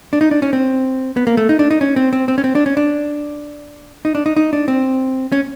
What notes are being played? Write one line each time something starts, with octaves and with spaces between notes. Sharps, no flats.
D4
D#4
D4
C#4
C4
B3
A#3
A3
D#4
D4
D#4
C#4
C4
C4
C4
C#4
C4
D4
C#4
D4
D#4
D4
D#4
D#4
D4
C4
C#4